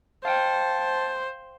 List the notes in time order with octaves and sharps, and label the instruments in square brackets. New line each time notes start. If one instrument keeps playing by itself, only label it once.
[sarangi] C5 [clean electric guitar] F5 G5 [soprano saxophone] A5